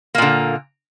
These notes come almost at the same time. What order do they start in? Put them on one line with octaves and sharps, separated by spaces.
A#3 A#2 D3